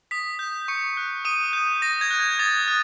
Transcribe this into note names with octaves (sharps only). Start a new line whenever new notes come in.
D#6 B6
G6
C#6 C#7
F#6
D#6 D#7
G6
D#6 A#6
G#6
F#6
G#6
D#6 A6
F#6